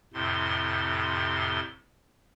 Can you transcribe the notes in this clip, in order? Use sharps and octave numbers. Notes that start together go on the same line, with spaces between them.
F2 A2 C3 C6